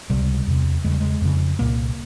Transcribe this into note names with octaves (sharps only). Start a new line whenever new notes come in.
C#2 C3 G3
E2 C3
E2 C#3 G#3
G3
G#3
F2 C#3
C2 A#2 A#3